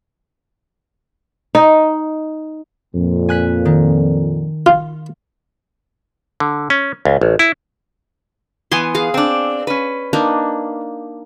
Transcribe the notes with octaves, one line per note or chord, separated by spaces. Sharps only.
D#4
F2 A#2
G#5 F#6 B6
D#3
F4
D3
C#4
C#2
A1
E4
E3 B3 G#5 C6
G#4 F5
C4 D4
C#4 B4
A#3 D4 D#4